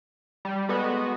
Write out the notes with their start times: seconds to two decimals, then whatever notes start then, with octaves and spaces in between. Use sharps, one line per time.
0.45 G3
0.69 G#3 B3 F#4 A4 B4